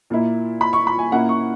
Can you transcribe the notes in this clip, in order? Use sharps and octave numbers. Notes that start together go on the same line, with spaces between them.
A#2 A#3 E4
B5
C#6
B5
G#5
A#2 A#3 C#4 E4 F#5
C#6